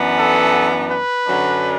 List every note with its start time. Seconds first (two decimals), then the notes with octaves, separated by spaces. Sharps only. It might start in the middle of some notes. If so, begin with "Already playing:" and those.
Already playing: F#2 E3 B3 D4
0.20 A4
0.92 B4
1.28 F#2 D3 F#3 D4